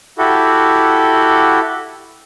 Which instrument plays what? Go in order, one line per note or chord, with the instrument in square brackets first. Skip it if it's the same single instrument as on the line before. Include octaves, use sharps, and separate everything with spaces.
[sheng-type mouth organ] E4 F#4 G4 A4